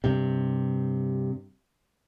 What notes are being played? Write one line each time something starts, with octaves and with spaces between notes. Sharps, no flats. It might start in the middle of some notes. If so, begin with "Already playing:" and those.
G2 C3